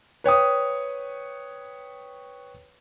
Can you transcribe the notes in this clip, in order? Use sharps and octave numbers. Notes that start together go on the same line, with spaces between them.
B4 C#5 G5 D#6